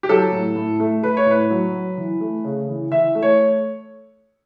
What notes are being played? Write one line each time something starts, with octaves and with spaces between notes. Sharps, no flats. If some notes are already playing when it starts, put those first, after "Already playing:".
G4
F#3 A4
A2
A2
A3
A3 B4
C#5
A2 B4
F#3
F#3
E3
A3
C#3
E3
E3 E5
A3
C#5